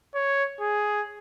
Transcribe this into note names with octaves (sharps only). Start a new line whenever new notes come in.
C#5
G#4